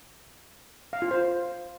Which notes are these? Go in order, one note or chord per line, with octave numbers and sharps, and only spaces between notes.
F5
F4
C5